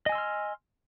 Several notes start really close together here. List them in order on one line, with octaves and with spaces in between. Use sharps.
D#5 G#5 E6 C6 F6